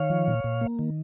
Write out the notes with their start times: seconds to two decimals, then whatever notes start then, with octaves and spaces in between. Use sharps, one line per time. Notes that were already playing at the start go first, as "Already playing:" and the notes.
Already playing: D#3 C#5 F5
0.10 F3
0.28 A#2
0.44 A#2
0.61 A#3
0.79 D#3